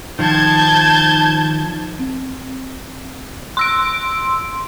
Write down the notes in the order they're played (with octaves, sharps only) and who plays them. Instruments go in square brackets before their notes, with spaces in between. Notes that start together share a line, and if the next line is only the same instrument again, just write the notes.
[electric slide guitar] D#3 F3 [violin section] A5 G6 G#6
[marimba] C4
[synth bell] C6 E6 D7